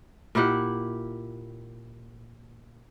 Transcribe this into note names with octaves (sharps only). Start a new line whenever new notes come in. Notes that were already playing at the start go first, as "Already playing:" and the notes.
A#2 E4 G4 F#5